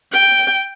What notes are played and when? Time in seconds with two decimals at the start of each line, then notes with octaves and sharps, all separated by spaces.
0.12 G5